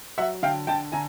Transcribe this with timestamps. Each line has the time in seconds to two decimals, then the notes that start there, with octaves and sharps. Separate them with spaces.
0.18 F#3 E5 F#5
0.43 D3 F5 G5
0.67 D3 G5 A5
0.92 D3 G#5 A#5